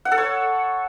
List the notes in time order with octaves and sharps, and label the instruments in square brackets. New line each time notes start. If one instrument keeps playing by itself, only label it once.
[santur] F#5
A4
C#5